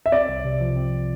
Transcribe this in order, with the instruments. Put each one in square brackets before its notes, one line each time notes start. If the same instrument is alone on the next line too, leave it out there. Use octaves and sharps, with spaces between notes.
[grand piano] E5
[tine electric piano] C4 [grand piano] D5
[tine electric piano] C2
C3
F3
C4